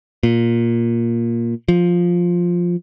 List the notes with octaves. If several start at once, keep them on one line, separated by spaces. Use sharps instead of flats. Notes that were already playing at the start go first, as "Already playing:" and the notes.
A#2
F3